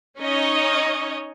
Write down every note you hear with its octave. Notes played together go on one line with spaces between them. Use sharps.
C#4 D#4 C#5 D#5